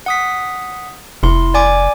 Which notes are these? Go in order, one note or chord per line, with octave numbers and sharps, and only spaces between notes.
F#5 D#6 B6
F1 E4 C6
D5 G#5 D6